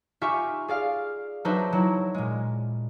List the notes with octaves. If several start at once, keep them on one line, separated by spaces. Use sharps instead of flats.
D#4 F4 G4 E5 G#5 C#6
G#4 D5 F5
F#3 D4 D#4 B4 C5 E5
F#3 E4
A#2 G#3